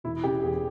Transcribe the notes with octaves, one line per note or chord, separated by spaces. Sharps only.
E1 E4
C#3 G4
E2 G#4